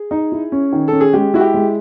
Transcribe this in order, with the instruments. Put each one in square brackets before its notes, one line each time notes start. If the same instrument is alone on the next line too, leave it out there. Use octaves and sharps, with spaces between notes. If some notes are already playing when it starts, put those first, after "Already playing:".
Already playing: [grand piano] G#4
[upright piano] D#4
E4
C#4
D#3
[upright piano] C#4 [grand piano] A4
[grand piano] G#4
[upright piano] G#3 [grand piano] G4
[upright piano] E4 [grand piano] F#4
[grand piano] G4
[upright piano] G#3